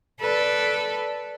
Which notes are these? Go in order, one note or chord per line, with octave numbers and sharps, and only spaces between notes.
A4 B4 D5